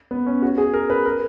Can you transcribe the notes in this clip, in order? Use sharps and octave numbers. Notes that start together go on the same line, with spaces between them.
B3
C#4
F#4
G#4
A#4
B4
A#4